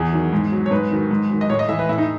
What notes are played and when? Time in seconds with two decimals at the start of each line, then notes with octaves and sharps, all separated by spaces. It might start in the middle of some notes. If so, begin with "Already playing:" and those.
Already playing: E2 G#4
0.13 D#3 F#3
0.33 G#2
0.52 F#3
0.66 C#5
0.71 G#2 B4
0.91 D#3 F#3
1.11 G#2
1.30 D#3 F#3
1.41 D#5
1.49 A2 C#5
1.59 D#5
1.69 E3 E5
1.79 B4
1.89 A2 E4
1.98 D#4